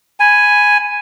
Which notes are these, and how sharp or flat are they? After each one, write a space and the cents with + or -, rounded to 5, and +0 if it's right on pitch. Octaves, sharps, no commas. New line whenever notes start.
G#5 +0 B5 +0